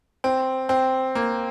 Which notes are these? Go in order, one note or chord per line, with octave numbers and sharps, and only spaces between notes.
C4
C4
A#3